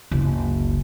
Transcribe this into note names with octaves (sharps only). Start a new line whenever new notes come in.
F#1 C#2